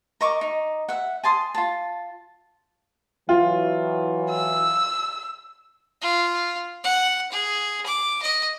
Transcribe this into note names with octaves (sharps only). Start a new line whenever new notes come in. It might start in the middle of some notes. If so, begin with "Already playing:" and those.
A#4 D#5 C#6 D6
D#4
E5 F#5
G#5 A5 C6 D#6
F4 A5
E3 F#3 F4
E6
F4
F#5
G#4
D6
D#5